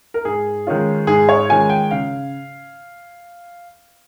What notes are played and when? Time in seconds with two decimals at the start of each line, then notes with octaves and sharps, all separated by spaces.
0.14 A#4
0.25 G#2 G#4
0.67 D#3 G#3 C#4 F4
1.07 G#2 G#4
1.29 C#5
1.49 D#3 G#3 C#4 F4 G#5
1.70 G5
1.91 C#3 F5